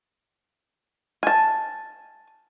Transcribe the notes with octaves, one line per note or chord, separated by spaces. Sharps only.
G#5 A5